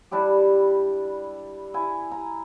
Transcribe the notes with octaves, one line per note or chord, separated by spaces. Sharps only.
G3 D4 E4 G4
E4 G#5
A#5